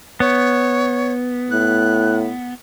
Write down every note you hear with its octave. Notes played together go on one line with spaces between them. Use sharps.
B3 C#5
A2 F#6